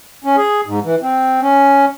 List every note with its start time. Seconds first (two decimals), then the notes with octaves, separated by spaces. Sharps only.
0.24 C#4
0.37 G#4
0.67 G#2
0.85 E3
1.02 C4
1.42 C#4